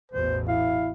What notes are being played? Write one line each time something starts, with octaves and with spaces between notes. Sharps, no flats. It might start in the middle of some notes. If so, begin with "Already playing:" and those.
A1 E2 B2 C5
E4 F5